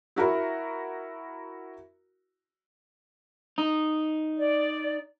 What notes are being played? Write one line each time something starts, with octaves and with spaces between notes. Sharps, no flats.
E4 F#4 A#4 A#5
D#4
D5